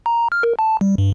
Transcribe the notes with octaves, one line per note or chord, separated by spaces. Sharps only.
A#5
F6
A#4
A5
G3
G2